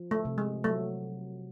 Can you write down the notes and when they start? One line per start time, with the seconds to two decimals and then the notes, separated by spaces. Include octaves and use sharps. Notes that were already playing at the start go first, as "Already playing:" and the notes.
Already playing: F3
0.11 A3
0.25 C3
0.38 G#3
0.64 F#3 A3